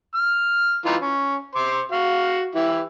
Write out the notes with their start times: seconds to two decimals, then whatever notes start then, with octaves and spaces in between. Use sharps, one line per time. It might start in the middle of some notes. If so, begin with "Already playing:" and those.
0.15 F6
0.86 E3 D#4 F4
1.00 C#4
1.55 C5 C6 D6
1.92 F#4 F5
2.55 E3 E4 G4